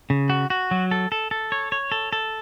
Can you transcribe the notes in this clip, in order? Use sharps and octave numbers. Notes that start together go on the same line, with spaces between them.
C#3
F#4
F#4
F#3
A4
A4
A4
C#5
C#5
A4
A4